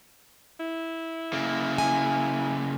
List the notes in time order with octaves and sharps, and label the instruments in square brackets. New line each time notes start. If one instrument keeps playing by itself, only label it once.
[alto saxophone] E4
[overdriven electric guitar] C#3 A#3
[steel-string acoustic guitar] G#5